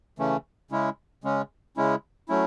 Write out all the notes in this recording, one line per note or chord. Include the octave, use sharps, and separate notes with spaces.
C#3 E3 A3 C#4
C#3 G#3 C#4 E4
C#3 G#3 C#4
C#3 G#3 C#4 E4
F#3 A3 C#4 E4